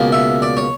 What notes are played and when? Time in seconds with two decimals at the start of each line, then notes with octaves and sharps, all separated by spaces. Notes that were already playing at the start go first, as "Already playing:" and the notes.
Already playing: C#2 B2 A#3
0.12 E5
0.42 D5
0.57 C#5